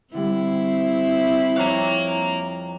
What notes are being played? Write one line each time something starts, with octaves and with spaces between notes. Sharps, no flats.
D3 G3 C4 E4
F2 C#5 F5 A#5 F#6